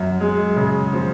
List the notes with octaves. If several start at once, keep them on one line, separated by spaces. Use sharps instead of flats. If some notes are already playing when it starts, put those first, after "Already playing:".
Already playing: F#2
G#3
C#3
F3